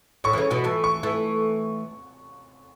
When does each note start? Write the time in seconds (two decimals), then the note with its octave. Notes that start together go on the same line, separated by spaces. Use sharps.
0.24 A2 C#6
0.33 E3
0.38 C#3
0.50 B2 E3
0.64 E3 A3
0.84 C#6
1.03 E3 A3